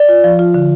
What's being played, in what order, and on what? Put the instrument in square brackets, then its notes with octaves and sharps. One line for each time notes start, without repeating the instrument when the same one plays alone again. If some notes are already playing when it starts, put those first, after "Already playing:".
Already playing: [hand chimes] D5
[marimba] F4
F3
F4
D3